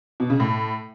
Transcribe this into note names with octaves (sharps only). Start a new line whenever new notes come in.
B2
C#3
A2